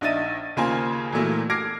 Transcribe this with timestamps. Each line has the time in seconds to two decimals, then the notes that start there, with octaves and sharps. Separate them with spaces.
0.01 A#1 D4 D#4 E5 A6 D#7
0.56 D#2 C#3 A#3 F4 C5 G#5
1.12 A#2 E3 F#3 A3 A#3
1.50 D6 F6 G#6 A#6 C7 D7